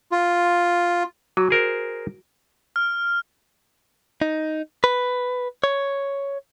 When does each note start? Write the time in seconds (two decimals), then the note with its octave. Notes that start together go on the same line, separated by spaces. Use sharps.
0.12 F4
1.37 F#3 F#4
1.50 G#4 A#4 C5
2.76 F6
4.22 D#4
4.84 B4
5.64 C#5